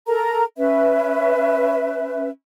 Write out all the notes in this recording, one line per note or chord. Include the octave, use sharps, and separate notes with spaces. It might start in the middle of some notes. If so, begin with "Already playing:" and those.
A4 A#4 A#5
C#4 B4 E5